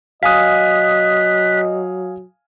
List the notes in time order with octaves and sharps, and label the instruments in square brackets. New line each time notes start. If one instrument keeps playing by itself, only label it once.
[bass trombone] F#3 [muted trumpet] D#5 [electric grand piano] F5 G#5 D#6 [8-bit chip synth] F#6 B6